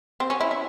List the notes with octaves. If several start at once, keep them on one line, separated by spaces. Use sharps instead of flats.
C4
C#4
E4
E4